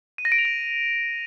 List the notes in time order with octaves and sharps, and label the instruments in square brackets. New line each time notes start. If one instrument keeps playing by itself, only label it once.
[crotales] D#7
A#6
D7
F7
D7